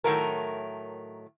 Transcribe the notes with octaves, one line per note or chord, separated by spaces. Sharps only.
A2 D#3 E3 F#3 A3 A#4